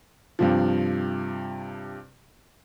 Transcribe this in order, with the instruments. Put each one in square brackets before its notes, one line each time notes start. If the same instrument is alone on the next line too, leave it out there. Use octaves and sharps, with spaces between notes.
[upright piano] G2 C3 F3